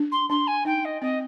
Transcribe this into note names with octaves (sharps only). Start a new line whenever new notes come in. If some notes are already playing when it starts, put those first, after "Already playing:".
Already playing: D4
C6
D4 C6
G#5
D#4 G5
D#5
C4 D#5